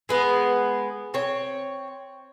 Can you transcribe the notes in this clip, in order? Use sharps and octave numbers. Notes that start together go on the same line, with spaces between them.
G#3 B3 G#4
C4 C#5